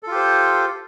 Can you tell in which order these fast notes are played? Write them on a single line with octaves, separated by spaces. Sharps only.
A4 F4 G4 C5